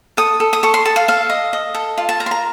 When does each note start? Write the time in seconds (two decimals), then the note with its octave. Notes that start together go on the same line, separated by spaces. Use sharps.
0.17 A4 D#6
0.40 A4
0.53 D#6
0.63 A4 C#6
0.74 C6
0.85 A4 A5
0.96 F5
1.08 A4 F5
1.30 D#5
1.53 D#5
1.74 A4
1.98 F4
2.09 A5
2.20 A#4 A#5
2.26 C6
2.31 A#5